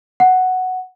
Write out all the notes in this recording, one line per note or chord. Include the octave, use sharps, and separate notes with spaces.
F#5